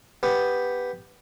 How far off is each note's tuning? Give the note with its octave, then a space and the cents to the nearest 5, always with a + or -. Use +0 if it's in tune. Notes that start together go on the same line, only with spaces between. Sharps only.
B3 +0 G4 +0